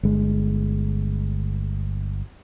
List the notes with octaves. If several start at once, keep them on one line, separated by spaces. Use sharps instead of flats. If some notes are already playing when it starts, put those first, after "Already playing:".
G1 G#3